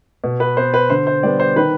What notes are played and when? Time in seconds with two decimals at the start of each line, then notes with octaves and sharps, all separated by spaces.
0.24 B2
0.40 B4
0.57 B3 C5
0.74 B4
0.90 D3 C5
1.07 C5
1.23 G3 B3 D5
1.40 C5
1.56 D#3 B4